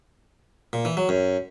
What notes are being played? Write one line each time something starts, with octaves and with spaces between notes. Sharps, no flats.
A#2
E3
F#3
F#2